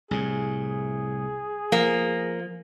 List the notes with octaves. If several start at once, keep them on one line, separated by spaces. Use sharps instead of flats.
C2 A2 G#4
F3 A#3